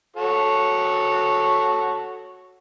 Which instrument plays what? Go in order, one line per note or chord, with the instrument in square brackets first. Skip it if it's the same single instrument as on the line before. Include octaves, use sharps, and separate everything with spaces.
[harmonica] F#4 A4 C#5